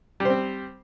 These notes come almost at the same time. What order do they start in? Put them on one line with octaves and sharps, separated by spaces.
G3 C5 C4